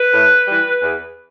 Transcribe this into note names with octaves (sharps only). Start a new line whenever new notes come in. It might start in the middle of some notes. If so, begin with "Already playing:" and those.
Already playing: B4
A2
E3 G3
E2